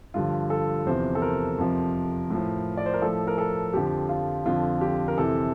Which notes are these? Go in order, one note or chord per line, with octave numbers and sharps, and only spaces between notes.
G2 D3 F3 F4
A4
E2 C3 F3 C5
A4
A#4
F2 C3 F3
A2 F3
D5
C5
A#4
A2 F3 A4
A#4
A4
F2 D3 F3 G4
F4
F2 D3 F3 F4
G4
A#4
F2 C3 E3 A4